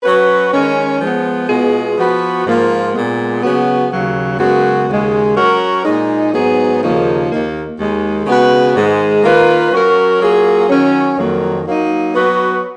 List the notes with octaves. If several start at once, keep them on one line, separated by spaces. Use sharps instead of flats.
F#3 C#4 F#4 B4
D#3 G#3 C#4
F3 G#3 B3
B2 G#3 B3 F4 G#4
F3 B3 F#4 B4
G#2 F3 A#3 F4
A#2 G#3 B3
C#3 F#3 B3 F#4
D#2 C#3 F#3
F#2 C#3 G#3 B3 F#4
D#2 C#3 G#3
F#3 C#4 F#4 A#4
A#2 G#3 D#4
G#2 F#3 B3 D#4 G#4
D#2 C#3 F3 A#3 D#4
D#2 D#3 A#3
D#2 D#3 G#3
C#3 G#3 B3 F#4 B4
G#2 D#3 G#3
D#3 A#3 F4 B4
F#3 C#4 F#4 A#4
F#3 A#3 F4 G#4
D#3 F#3 C#4
F2 D#3 F#3 A#3
F#3 A#3 D#4
F#3 B3 F#4 B4